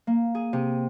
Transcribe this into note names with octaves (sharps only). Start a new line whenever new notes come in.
A#3
G#4
C3